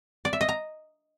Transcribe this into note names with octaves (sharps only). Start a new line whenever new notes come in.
D5
E5
D#5
A#5